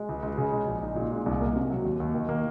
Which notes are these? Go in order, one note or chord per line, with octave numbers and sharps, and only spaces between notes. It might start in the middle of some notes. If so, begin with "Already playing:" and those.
Already playing: G#3
C#2
C#2
C#3
G#3
A#1
D#4
A#2
G#3
C2
A#3
C3
F#3
D#2
D#2
D#3
A#3